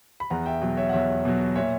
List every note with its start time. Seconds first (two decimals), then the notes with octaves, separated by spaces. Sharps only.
0.20 B5
0.30 E2 F#5 A#5
0.46 E5 G5
0.62 B2 F#3
0.77 C#5 E5
0.89 F#5
0.93 E2 C#5 E5
1.25 B2 F#3
1.55 A#2 C#5 E5